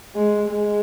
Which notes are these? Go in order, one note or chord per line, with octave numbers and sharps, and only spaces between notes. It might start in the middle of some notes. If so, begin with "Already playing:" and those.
G#3
G#3